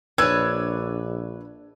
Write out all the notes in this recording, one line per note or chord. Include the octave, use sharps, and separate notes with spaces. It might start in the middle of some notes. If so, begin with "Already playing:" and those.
A#1 D4 B4 C#5 E6 G#6